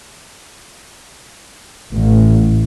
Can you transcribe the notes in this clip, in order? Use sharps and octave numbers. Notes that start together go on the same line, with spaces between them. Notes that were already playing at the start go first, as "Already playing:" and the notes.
A1